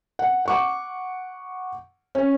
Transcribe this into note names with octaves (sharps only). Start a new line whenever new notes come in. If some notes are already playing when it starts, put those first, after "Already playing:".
F#5
F#5 C#6 D6
C#4